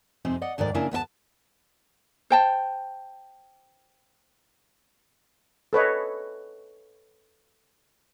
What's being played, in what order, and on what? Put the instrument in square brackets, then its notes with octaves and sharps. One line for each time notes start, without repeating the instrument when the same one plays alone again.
[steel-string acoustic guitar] F2 C3 C4 D#4 G#4
D5 D#5 F#5
D2 G#2 D#3 A#4 D5
C#3 A#3 D4 E4 A#4 G#5
D2 B3 E4 A5
[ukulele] C5 G5 A5
[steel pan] A4 B4 C#5 D#5